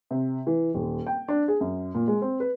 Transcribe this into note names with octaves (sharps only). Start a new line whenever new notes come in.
C3
E3
D#1
G5
D4
G#4
F#2
A#2
G#3
C4
B4